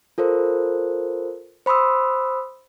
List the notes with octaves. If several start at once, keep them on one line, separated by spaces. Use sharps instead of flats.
F4 A4 A#4 C5
C5 B5 C6 D#6 E6